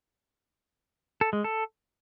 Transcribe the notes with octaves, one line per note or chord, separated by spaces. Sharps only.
A4
G#3
A4